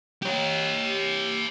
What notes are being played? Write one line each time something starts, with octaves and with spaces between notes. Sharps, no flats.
G4 C#5